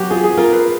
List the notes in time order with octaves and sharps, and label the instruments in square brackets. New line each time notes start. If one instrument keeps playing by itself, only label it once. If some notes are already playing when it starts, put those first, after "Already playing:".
Already playing: [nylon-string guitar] F#3 [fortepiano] F#4 G4
[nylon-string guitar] F4 [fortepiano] G#4
[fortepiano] G#4
[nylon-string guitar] F4 [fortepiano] A#4
[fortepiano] B4